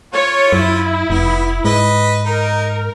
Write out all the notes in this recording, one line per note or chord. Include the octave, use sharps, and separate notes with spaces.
F4 C#5
F#2 E4
F1 B3
G#2 B4 D#5
D#4 A#4